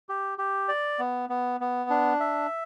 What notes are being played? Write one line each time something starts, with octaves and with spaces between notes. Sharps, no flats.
G4
G4
D5
B3
B3
B3
D4
E5